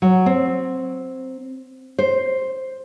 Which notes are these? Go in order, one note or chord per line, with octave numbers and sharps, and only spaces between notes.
F#3
C4
C5